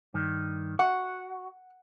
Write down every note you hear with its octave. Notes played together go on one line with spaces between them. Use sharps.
G2 D#3
F#4 F#5